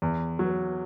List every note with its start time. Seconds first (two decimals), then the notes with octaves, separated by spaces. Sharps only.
0.02 E2
0.39 F#3